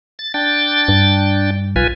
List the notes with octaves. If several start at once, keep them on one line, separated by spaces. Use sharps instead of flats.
A6
D4 G5 A6
G2
B1 F4 B4 G#5